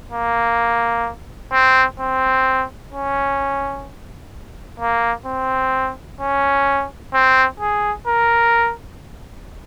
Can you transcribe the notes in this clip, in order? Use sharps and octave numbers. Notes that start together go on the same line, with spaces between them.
A#3
C4
C4
C#4
A#3
C4
C#4
C4
G#4
A#4